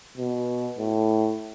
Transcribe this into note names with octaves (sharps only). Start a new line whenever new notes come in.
B2
A2